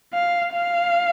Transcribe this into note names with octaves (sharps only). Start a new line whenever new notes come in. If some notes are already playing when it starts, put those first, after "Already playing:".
F5
F5